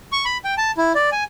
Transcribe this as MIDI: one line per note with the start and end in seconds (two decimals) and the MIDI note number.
0.12 0.25 85
0.25 0.37 83
0.44 0.55 79
0.58 0.71 81
0.77 0.93 64
0.95 1.09 74
1.12 1.24 80